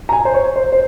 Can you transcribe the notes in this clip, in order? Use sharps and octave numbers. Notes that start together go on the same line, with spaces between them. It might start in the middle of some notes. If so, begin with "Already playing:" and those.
A#5
G#5
C5
C#5
C5
C5